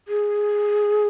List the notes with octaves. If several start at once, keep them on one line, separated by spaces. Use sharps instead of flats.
G#4